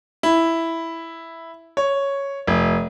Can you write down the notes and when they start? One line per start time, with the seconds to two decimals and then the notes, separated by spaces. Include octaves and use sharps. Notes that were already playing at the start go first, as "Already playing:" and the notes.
0.23 E4
1.77 C#5
2.47 F1